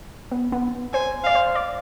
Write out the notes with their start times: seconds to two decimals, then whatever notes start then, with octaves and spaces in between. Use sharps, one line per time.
0.31 B3
0.52 B3
0.93 C5 G#5
1.24 D5 F5
1.35 C5
1.55 D5